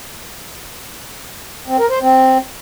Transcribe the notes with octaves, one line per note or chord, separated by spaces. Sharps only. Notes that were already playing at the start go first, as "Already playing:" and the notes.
C4
A#4
C5
C4